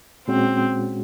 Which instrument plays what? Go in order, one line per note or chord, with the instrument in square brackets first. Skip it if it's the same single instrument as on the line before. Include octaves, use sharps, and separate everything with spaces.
[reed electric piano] A#2 G#3 C#4 F#4 [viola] C4